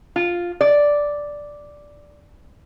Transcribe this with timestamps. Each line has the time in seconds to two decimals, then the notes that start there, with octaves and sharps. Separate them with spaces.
0.16 F4
0.61 D5